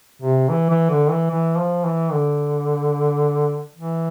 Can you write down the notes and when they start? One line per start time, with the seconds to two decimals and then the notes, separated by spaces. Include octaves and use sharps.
0.22 C3
0.49 E3
0.69 E3
0.90 D3
1.10 E3
1.30 E3
1.58 F3
1.85 E3
2.13 D3
3.76 E3